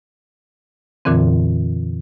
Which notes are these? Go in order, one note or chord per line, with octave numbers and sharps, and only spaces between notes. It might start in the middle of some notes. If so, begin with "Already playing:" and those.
F2 A#2 D3 E3 C4